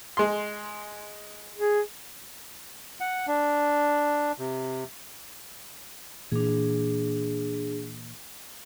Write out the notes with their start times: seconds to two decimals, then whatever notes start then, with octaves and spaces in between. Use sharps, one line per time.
0.17 G#3 C6
1.57 G#4
3.00 F#5
3.27 D4
4.38 C3
6.31 A#2 E3 D4 G#4